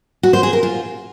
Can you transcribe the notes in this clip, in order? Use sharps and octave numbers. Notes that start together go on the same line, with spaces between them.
F#4
C5
G#4
A#4
F4